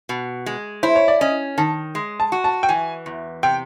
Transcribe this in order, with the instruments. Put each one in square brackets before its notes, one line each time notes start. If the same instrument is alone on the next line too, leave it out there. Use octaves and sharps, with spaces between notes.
[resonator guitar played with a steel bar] B2
G#3
[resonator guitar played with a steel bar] E4 [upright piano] C5
[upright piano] C#5
D5
[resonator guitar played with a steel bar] C#4 [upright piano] D#5
[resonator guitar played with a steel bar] D#3 [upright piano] A5
[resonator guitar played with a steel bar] G#3
[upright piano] A5
[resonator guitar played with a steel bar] F#4
[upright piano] A5
G5
[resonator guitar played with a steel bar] E3 [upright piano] G#5
[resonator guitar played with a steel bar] E2
[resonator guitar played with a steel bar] C3 [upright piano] G5